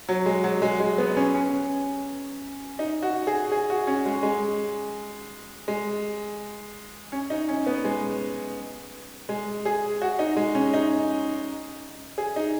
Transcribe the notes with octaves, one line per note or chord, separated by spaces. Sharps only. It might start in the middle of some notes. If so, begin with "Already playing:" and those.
F#3
G#3
F#3
G#3
G#3
B3
C#4
C#4
D#4
F#4
G#4
G#4
F#4
C#4
G#3
G#3
G#3
C#4
D#4
C#4
B3
G#3
G#3
G#4
F#4
D#4
G#3
C#4
D#4
G#4
D#4